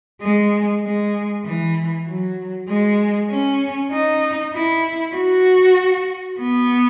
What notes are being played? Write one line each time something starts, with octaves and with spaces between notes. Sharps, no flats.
G#3
G#3
E3
F#3
G#3
C#4
D#4
E4
F#4
B3